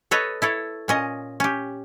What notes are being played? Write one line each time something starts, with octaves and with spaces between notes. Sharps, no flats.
A4 B4 C#5 D#5
E4 A4 C#5
A#2 C#4 D#5
C#4 G4